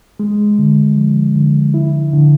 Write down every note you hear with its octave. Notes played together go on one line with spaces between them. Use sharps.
G#3
D3
F3
D3
E4
D3